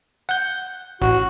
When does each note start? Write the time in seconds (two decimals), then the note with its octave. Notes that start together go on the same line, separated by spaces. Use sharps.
0.29 F#5 G6
1.01 A1 F#4